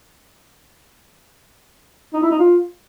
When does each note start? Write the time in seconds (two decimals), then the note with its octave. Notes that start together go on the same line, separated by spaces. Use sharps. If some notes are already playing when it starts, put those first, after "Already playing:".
2.14 D#4
2.22 E4
2.31 D#4
2.39 F4